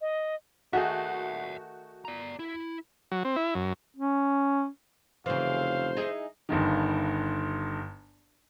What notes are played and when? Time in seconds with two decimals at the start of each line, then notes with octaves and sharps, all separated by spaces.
0.01 D#5
0.73 D#3 A3 F#4 G#4 E5 F#5
2.05 D5 A#5
2.39 E4
3.12 F#3
3.25 C4
3.36 E4
3.55 F#2
3.96 C#4
5.26 F1 C#3 E3 C5 F5
5.97 D#4 E4 G#4
6.49 G1 G2 D#3